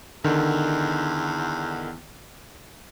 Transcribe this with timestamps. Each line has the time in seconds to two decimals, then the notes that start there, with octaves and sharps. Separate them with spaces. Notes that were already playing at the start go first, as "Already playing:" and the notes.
0.24 E2 D3 D#3